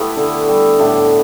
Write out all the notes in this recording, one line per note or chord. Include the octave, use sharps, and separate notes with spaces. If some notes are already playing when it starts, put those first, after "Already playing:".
Already playing: A3 B3 E4 G4 A4 B4
D3
G3
A2 D4 G4